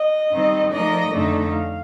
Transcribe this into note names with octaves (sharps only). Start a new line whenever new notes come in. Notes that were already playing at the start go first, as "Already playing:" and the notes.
Already playing: D#5
D#3 G3 C4 D#4
F3 A3 D#4 A#4 D5 D#5
F2 D3 A3 D#4
F5